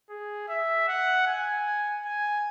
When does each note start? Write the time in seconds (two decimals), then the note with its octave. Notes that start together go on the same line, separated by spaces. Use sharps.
0.10 G#4
0.49 E5
0.88 F#5
1.27 G#5
2.05 G#5